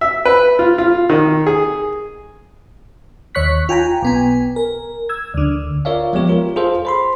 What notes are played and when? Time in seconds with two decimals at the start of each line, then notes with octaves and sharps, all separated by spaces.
0.01 E5
0.25 B4
0.59 F4
0.78 F4
1.10 D#3
1.47 G#4
3.35 D#2 C#5 C#6 F#6 B6
3.69 F4 G5 G#5 A#5
4.02 B1 B3 G#5
4.56 A#4
5.09 E6 G#6
5.34 D2 D3
5.85 F4 A#4 C#5 D5 E5 F5
6.13 F3 G#3 B3 G4 C#5
6.29 F4 A#4
6.56 F4 G#4 A4 C5 F5
6.85 C5 B5 C6